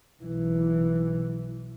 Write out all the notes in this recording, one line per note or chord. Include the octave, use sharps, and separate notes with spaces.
B1 E3